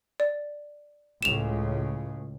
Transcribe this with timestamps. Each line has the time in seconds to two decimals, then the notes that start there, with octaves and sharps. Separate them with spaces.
0.20 D5
1.23 C#2 A2 C#3 E7 F7